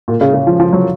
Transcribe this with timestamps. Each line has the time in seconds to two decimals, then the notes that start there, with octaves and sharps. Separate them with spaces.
0.08 A#2
0.21 C#3
0.34 C#3
0.47 F3
0.60 F3
0.73 F#3